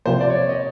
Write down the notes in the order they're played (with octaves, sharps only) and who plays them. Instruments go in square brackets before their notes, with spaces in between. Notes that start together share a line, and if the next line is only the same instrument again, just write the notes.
[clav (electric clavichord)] C3 F3 A#3 [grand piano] C5
[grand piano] D5
C#5
D5
D#5